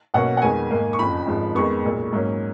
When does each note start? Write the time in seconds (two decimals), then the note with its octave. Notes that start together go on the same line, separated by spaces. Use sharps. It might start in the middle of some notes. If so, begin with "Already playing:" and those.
0.14 B1 B2 A#3 C#4 F#5
0.37 F#5
0.42 F2 D#3 G#3 B3 G#5
0.70 G#2 D#3 A#3
0.93 C#6
0.99 F#1 F2 F3 B5
1.27 G#1 G#2 F3 G#3
1.55 F2 D#3 G#3 B3 C#6
1.84 B1 A#2 G#3
2.12 G#2 F#3 A#3 C#4